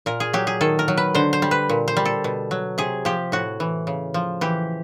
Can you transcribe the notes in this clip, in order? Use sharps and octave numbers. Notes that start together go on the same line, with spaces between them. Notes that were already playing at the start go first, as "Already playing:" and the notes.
A#2 A#4
G#4
F#3 G4
G#4
D#3 A4
A#4
F#3
B4
D3 C5
C5
G3
B4
A#2
C5
G3
A4
B2
F#3
C3 G#4
F3 G4
A2 F#4
E3
C#3
F3
E3 G4